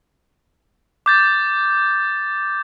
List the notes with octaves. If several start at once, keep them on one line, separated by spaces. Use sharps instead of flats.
D6 G6 A6